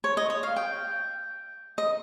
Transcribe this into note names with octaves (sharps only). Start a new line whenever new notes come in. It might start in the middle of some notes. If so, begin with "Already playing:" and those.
C#5
D#5
C#5
F5
G5
D#5